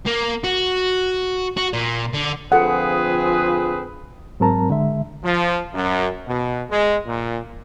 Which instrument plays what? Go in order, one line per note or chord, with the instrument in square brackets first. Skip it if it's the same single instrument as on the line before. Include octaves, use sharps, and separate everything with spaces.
[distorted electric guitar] A#3
F#4
F#4
A#2
D3
[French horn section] D3 F3 F4 [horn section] C4 G#4 B4 [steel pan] A4 F#5
[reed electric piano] G#2 F#3 C4 A#4 A5 A#5
D3 G#3 E5
[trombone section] F3
F#2
B2
G#3
A#2